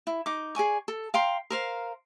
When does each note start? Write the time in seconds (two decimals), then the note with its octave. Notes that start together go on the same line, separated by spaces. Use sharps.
0.07 E4
0.26 D#4 D6
0.55 G#4 D5 G#5 C#6
0.88 A4
1.14 F5 G5 A#5 C6
1.50 A#4 C5 F5